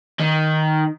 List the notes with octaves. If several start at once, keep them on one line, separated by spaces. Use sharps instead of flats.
D#3